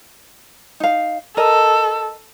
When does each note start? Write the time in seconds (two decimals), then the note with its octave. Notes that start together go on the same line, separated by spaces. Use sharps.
0.80 D#4 F5
1.37 A4 A#4 D#5